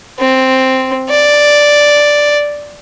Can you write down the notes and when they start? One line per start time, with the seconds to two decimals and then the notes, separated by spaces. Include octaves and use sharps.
0.19 C4
1.10 D5